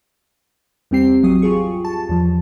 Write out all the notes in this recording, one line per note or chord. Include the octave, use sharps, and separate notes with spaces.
E2 G3 C4 G4 C7
G#1 F#3 D#6
F4 G4 G#4 C#6
A5
E2 F3